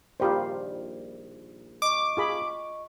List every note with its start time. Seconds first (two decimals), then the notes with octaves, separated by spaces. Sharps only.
0.20 A#1 D#3 G3 F4 G4 C5
1.82 D#5 C#6 D6
2.17 F4 G#4 B5